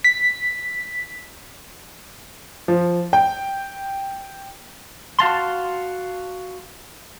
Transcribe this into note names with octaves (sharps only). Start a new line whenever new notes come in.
B6
F3
G5
F#4 F5 A5 C6